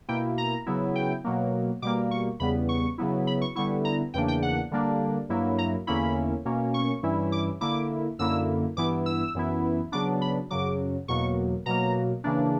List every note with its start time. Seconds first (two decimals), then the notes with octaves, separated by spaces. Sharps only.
0.08 B2 A#3 E4 G5
0.38 A#5
0.66 C#3 F#3 B3 E4
0.95 G5
1.24 B2 F#3 A#3
1.82 B2 G3 A#3 D6
2.11 C#6
2.40 E2 C#3 G3 B3 B5
2.69 C#6
2.98 C#3 F#3 B3 E4
3.27 B5
3.41 C#6
3.55 D3 G3 B3 E4 C#6
3.85 A#5
4.14 E2 C#3 E3 A#3 D4 G5
4.28 G5
4.42 F#5
4.71 D3 G3 A#3 D4
5.29 G2 F#3 A#3 E4
5.58 A#5
5.87 E2 D3 A#3 C#4 E4 B5
6.45 B2 A#3 C#4
6.74 C#6
7.03 G2 E3 G3 C#4 E4
7.32 D6
7.61 D3 A#3 E4 D6
8.19 F#2 D3 A#3 E4 E6
8.77 G2 E3 B3 E4 D6
9.06 E6
9.35 F#2 E3 B3 E4
9.92 C#3 F#3 B3 D4 D6
10.22 B5
10.50 F#2 C#3 F#3 D6
11.08 E2 B2 F#3 A#3 C#6
11.66 B2 F#3 A#3 A#5
12.24 C#3 E3 A#3 D4